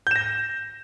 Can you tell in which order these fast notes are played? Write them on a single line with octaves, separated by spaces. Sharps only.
G6 E7 A#6